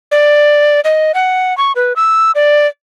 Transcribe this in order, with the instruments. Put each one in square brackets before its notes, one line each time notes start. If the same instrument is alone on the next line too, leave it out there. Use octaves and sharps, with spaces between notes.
[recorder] D5
D#5
F#5
C#6
B4
E6
D5